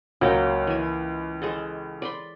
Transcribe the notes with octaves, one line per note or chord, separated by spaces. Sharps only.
C#2 F#3 A#3 G5
E3 G#5
G#3 G#4 A4
D5 B5 C6